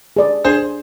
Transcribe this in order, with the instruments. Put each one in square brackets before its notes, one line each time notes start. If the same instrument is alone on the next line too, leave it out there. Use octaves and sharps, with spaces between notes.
[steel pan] G#4 D5
[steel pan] D4 [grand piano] G#4 C5